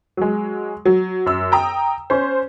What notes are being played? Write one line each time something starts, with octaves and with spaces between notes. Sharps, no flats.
F#3 G#3
F#3
F#2 E6
G5 A#5 D#6
C#4 C5